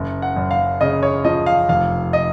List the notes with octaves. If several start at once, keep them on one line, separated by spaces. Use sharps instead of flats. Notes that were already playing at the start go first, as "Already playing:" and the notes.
Already playing: F#1
F#5
F#2
F5
C#3 D#5
C#5
F3 D#5
F5
F1 F5
D#5